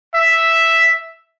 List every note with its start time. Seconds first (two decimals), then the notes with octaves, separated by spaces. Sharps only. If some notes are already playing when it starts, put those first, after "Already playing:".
0.15 E5